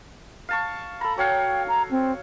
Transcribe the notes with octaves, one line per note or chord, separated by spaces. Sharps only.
F5 A5 C#6
A4 A#5 B5
F#3 C#5 F5 G5
A#5
C4